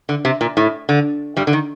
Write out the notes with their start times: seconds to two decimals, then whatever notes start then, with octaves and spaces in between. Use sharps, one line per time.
0.09 D3
0.25 C3
0.41 A#2
0.57 A2
0.89 D3
1.37 G2 G3
1.47 D3
1.53 D#3